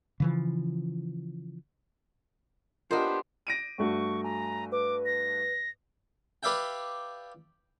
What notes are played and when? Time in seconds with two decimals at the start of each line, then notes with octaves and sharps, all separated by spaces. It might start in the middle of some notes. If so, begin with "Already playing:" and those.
0.20 C#3 E3 F3
2.91 B3 D4 F4 G4 A#4 C5 D#5
3.47 A#6 D7 D#7
3.78 G2 A3 F#4 C#6
4.24 G#5 A#5
4.72 B4 D6
5.06 A#6
6.43 G4 B4 D5 E5 F5 G5